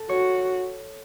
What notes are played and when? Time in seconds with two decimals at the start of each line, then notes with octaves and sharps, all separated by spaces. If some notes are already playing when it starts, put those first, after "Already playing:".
Already playing: A4
0.09 F#4 C#5